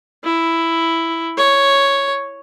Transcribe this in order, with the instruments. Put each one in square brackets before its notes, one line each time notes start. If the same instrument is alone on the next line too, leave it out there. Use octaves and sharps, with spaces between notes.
[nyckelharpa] E4
C#5